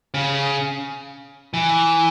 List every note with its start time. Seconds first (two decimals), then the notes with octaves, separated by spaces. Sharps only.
0.14 C#3
1.54 E3